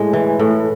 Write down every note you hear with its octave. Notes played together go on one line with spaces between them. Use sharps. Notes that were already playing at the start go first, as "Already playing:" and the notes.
Already playing: A2 G#3
E3
A2